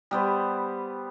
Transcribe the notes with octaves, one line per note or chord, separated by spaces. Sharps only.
G3 B3 C5